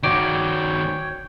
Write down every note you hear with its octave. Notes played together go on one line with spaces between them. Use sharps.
D#3 F#4 C#5 D5 G5